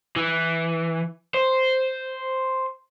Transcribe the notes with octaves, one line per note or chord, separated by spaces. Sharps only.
E3
C5